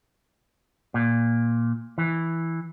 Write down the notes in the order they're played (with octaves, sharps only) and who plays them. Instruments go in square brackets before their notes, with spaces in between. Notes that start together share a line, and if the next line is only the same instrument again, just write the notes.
[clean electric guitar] A#2
E3